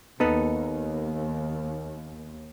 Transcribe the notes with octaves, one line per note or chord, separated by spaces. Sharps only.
D#2 B3 D#4 A4